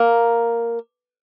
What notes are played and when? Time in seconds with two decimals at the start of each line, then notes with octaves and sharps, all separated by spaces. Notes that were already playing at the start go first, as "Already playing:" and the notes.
Already playing: A#3